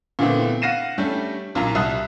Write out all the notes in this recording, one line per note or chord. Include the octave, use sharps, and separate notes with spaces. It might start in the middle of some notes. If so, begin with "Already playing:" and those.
A#2 D3 E3 A3 B3 C4
F5 F#5 A#6 C7 D#7 E7
G3 A3 C#4 D4 G4 A4
B1 A#2 F4 A#5
C2 E5 A5 D#6 F#6